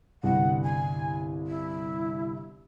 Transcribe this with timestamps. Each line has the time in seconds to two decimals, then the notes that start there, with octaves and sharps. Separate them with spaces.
0.23 G1 C2 F#5
0.63 G#5
1.47 E4